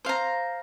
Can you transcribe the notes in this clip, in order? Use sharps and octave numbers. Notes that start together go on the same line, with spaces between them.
C5 F5 A#5